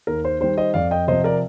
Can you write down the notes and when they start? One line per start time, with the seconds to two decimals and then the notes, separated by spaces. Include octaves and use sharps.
0.07 D#2 A#4
0.25 C5
0.41 D#3 G3 C5
0.58 C5 D#5
0.74 F2 D5 F5
0.91 D#5 G5
1.07 C3 F3 C5 D#5
1.24 A#4 D5